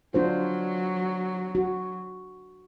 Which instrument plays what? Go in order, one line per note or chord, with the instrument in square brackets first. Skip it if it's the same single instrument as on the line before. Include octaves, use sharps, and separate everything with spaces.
[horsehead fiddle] F#3 [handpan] D4 F4 C5
[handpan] F#4